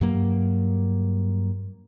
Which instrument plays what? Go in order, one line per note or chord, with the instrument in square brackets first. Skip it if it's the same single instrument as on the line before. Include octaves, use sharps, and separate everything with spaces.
[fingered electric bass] G2 F#3 A#3